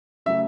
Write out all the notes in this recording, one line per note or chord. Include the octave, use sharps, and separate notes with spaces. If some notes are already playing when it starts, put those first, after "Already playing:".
C#3 F#3 A3 E5